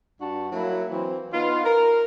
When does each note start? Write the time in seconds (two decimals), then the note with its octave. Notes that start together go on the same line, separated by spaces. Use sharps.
0.21 G2 D4 F#4 A5
0.52 F#3 A#3 E4
0.91 E3 F#3 C4
1.32 B3 D#4 F4
1.64 A#4